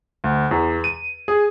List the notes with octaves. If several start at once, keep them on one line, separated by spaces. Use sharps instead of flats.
D2
E2
D#7
G#4